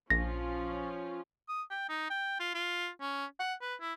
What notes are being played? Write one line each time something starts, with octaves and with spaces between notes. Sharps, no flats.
A#1 F3 C#4 F4 A#6
D#6
G5
D#4
G5
F4
F4
C#4
F#5
B4
E4